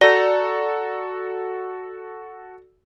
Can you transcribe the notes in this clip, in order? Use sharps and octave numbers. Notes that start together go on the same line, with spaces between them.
F#4 A4 D5 A#5